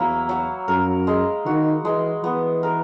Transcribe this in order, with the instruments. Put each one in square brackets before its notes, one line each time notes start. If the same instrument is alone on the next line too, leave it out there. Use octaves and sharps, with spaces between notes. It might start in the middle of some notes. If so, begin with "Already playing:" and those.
Already playing: [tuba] E2 [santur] F#3 A#3 E4
[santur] F#3
[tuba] F#2 [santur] A#4
[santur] G#3
[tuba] D#3 [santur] F#4
[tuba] E3 [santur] G#3
[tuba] E3 [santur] B3
[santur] A#4